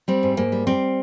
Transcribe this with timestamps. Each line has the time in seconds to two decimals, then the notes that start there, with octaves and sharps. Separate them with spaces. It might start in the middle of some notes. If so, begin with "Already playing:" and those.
0.08 G3 C4
0.23 G#2
0.37 G#2 A#3
0.52 G3
0.67 G3 C4